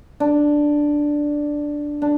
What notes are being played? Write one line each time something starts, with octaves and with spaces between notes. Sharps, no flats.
D4
D4